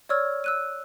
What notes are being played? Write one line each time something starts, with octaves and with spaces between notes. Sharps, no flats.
C#5 D5 C#6 E6 F6 G#6
E6 F#6 D#7